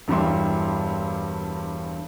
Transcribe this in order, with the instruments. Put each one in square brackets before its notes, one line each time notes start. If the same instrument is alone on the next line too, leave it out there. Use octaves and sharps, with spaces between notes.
[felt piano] E1 G2 E3 G3 E5 C6